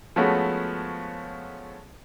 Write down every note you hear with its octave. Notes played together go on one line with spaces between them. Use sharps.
F3 G#3 A3 B3 C#4 F#4